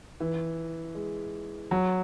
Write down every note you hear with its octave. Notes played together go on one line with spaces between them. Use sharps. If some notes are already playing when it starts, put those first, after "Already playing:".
E3
G#3
F#3